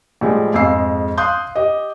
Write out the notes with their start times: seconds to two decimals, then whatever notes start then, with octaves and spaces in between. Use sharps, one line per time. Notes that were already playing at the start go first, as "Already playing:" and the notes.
0.21 A2 F3 G3 G#3
0.54 F2 G#2 G#3 F5 E6 C7
1.17 F5 C6 D#6 F#6 G6
1.55 G4 D#5